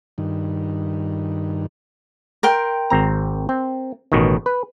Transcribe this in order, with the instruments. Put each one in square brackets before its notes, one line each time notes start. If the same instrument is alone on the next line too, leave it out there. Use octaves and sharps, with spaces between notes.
[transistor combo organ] G2 D#3
[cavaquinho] A#4 G5 C6
[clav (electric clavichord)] G#1 C4 A#5
C4
A1 B2 D#3
B4